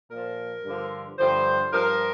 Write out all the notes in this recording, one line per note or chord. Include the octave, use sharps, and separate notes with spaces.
A#2 F3 A#4
G2 D3 F3
G2 D3 F3 C5
G2 F3 A#4